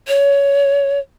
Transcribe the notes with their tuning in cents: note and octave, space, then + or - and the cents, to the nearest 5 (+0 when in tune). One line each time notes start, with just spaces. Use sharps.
C#5 +20